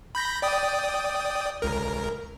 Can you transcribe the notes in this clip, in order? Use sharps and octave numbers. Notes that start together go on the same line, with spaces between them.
B5 G6 A#6
D5 G5 D#6
C#2 A#4